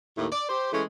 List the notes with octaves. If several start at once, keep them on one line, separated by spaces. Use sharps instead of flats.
D#2 A2
D5
G4 C5
E3 G#3 A3 C#4